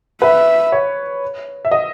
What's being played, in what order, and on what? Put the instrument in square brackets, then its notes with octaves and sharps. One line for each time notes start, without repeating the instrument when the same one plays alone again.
[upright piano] B4 [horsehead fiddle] E5
[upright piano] C#5
E5
D#5